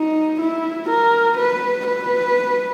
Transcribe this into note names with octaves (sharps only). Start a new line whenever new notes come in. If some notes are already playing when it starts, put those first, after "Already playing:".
Already playing: D#4
E4
A#4
B4
B4